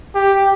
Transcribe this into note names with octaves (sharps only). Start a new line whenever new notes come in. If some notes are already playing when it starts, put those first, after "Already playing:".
G4